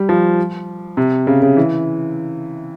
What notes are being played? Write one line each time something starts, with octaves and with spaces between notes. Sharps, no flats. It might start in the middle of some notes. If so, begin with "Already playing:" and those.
Already playing: G3
F3
C3
C#3
C#3
E3